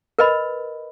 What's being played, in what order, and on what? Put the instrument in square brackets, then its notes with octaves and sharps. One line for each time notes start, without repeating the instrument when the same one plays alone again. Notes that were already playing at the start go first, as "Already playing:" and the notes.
[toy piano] A#4 B4 D#5 B5